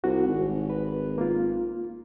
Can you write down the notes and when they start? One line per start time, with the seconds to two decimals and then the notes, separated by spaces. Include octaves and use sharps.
0.04 C2 F#4
0.26 G#1
0.70 B4
1.18 A#3 F4